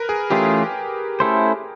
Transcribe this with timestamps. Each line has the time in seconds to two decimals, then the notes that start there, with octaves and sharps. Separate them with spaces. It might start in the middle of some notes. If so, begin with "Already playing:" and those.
Already playing: A#4 B4
0.09 G#4
0.30 E3 A3 C#4 F4 G4 G#4
1.20 A3 C#4 E4 A4 C5